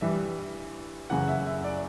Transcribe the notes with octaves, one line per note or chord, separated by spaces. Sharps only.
G2 E3 G3 E5
F#2 C#3 E3 F#5
E5
E5
D5